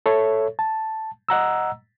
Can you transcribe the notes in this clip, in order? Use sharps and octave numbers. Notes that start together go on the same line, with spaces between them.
A4 C#5 E5
A5
D#5 F#5 A#5 E6